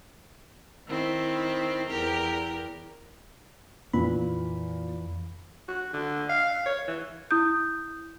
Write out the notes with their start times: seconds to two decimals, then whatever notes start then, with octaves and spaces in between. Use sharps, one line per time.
0.87 D#3 C4 E4
1.89 E2 G4 A#4
3.94 F2 A#2 E3 B5
5.68 F#4
5.93 D3
6.29 F5
6.66 C#5
6.87 E3
7.31 E4 D#6 G6